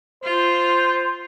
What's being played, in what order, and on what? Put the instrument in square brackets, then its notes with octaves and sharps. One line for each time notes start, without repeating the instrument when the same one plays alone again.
[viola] F4 [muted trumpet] C5